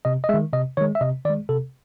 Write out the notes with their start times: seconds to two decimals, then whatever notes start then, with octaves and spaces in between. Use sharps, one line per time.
0.05 C3 D#5
0.24 D#5
0.29 G#3 E5
0.34 D#3
0.53 C3 D#5
0.77 D#3 G#3 C#5
0.95 E5
1.01 C3 D#5
1.25 D#3 D5
1.30 G#3
1.49 C3 A4